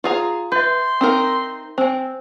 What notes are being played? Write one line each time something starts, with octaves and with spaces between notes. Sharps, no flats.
F4 G#4 A#5
B4 E5 C6 G6
C4 D#4 A#4
C4 C5 G#5